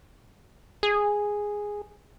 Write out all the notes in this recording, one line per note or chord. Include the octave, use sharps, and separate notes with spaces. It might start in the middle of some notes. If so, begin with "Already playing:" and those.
G#4